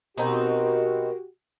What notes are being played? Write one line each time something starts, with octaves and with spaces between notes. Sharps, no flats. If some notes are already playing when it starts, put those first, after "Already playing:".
B2 C4 D#4 F#4 G4 A#4